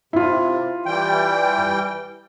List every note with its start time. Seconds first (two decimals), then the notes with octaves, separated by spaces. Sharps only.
0.13 C3 E4 F4
0.86 E3 G3 G5